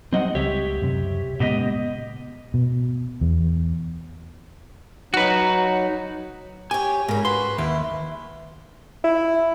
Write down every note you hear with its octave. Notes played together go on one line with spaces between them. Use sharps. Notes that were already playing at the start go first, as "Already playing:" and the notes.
F#3 G3 C4 D#5 F#5
C#2 G4 C#5 E5
F#2 C3
A#2 C#3 G#3 B3 G4 D#5
B2
E2
F#3 D#4 F#4 B4
G4 C#5 G#5
G#2 C#3 A#4
F#4 B4 C6
D#2 E4
E4